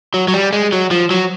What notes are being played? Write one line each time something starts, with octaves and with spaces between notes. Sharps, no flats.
F#3
F#3
G3
G#3
F#3
F3
F#3